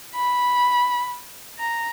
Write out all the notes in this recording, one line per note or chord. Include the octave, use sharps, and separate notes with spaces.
B5
A#5